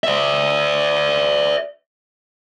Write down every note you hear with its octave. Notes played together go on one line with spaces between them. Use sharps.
D5 E5